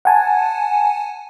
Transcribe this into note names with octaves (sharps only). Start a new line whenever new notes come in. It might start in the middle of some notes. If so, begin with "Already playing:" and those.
F#5 G#5 A5